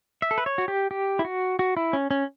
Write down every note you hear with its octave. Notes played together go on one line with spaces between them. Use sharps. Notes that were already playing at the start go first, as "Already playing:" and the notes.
E5
A4
B4
C#5
F#4
G4
G4
E4
F#4
F#4
E4
C#4
C#4